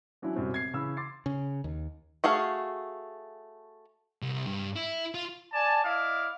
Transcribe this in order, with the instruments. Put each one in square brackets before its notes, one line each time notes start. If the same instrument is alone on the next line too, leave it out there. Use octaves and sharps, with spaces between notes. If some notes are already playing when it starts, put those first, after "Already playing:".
[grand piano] E3 F#3 C#4 D4 E4
B1 F#2 C3 F#3 G3 C4
C3 G#6 C7
C#3 E3 B5 E6
C6 D6 A6 C7
[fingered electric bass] C#3
D#2
[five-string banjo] A3 F#4 G#4 F5
[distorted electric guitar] C2
G2
E4
F4
[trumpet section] D5 G#5 A5
E4 D5 D#5 F5